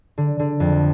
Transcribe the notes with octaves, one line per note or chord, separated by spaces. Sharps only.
D3
D3
F2